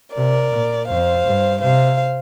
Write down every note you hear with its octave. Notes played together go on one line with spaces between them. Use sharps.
C3 A#4 D5
A#2
F2 C5 F5
G2
C3 C5 F5